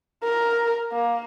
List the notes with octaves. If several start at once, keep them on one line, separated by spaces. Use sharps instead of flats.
A#4
A#3